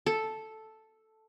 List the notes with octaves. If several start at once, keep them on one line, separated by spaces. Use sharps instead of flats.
A4